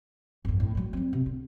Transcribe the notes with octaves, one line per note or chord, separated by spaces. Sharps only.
G1 F2
A2
F#3 G#3
G3 C4
C3
D3 C4